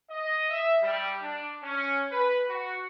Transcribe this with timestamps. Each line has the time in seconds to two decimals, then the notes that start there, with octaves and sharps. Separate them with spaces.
0.10 D#5
0.50 E5
0.83 G3
1.22 D4
1.63 C#4
2.11 B4
2.48 F#4